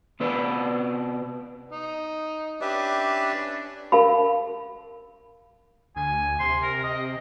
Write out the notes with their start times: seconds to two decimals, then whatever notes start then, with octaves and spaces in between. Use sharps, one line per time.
0.20 C3 B3 B4 D5
1.72 D#4
2.61 C#4 D4 G4 B4 E5
3.92 A#4 F5 A5 B5
5.96 D2 G#5
6.40 C3 C6
6.62 A#4
6.84 D#5